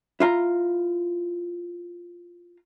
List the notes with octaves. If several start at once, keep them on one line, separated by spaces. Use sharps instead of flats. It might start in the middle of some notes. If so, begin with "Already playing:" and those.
E4 F4 A#5